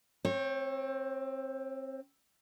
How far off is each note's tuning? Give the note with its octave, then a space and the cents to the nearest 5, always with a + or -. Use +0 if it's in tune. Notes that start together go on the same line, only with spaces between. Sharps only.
C4 +15 C#5 -25